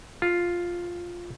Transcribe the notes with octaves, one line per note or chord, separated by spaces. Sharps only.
F4